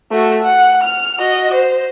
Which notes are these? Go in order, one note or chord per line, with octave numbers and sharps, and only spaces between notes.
A3 F#4
F#5
F6
F#4 D#5
C5